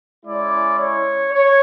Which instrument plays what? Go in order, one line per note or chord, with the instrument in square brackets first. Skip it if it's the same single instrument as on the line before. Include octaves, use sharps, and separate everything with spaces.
[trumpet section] G#3 C#4 E4 D5
C#5
C#5